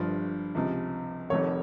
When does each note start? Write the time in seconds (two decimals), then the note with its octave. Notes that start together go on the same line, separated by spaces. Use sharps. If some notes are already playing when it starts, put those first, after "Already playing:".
Already playing: G1 G2 F3
0.55 C#2 C3 F3
1.30 F1 F2 D#3 C#5